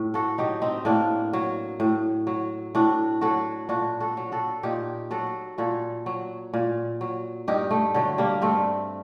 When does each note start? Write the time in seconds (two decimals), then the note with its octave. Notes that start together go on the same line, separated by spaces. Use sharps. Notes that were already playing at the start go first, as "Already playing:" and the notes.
Already playing: A2
0.14 F#4 A4
0.38 F#3 D#4 G4
0.62 C4 D#4
0.85 A2 A#3 D4
1.33 F#3
1.80 A2
2.27 F#3
2.75 A2 D4 F#4
3.21 F#3 F#4 A4
3.69 A#2 D4 F#4
4.00 F#4 A4
4.17 F#3
4.32 F#4 A4
4.63 A#2 D#4 G4
5.11 F#3 F#4 A4
5.58 A#2 F#4 A4
6.06 F#3
6.54 A#2
7.01 F#3
7.48 G2 D#4 G4
7.71 A3
7.94 D3 F#3
8.18 G3 A#3
8.41 G2 A3 C4